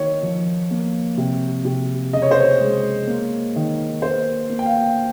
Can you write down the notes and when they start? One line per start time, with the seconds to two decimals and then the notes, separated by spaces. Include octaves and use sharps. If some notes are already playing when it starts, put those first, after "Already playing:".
Already playing: D#3 C#5
0.23 F3
0.71 A#3
1.17 C3
1.65 C3
2.13 C#3 D#5
2.22 C#5
2.31 C5
2.41 C#5
2.61 G#3
3.07 A#3
3.56 D#3
4.02 A#3 C5
4.50 A#3
4.59 G5
4.66 F5